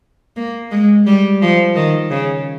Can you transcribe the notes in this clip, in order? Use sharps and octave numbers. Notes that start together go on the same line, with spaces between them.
A#3
G#3
G3
F3
D#3
C#3